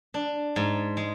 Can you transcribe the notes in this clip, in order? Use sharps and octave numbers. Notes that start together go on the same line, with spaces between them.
D4
G#2
G#3